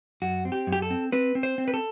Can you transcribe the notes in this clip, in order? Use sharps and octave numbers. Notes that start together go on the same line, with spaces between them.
F#2 F#4
C4
G4
F#2
G4
A4
C4
C4 B4
C4
C5
C4
B4
A4